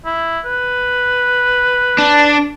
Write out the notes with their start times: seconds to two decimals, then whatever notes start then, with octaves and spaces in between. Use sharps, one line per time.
0.05 E4
0.45 B4
1.98 D4